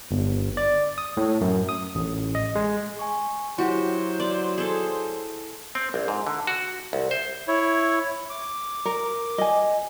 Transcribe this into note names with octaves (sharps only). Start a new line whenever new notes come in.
G1
D5
D#6
A2
F#2
D#6
A1
D#5
G#3
G#5 C#6
F#3 E4 F#4 G4 C5
D5
G#4 A4
C4
A#1
G#2
D3
F#4
C2
C5
E4 C#5
D6
A#4
D#5 G#5